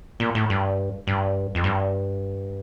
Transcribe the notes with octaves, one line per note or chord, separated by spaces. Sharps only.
A#2
A2
G2
G2
F2
G2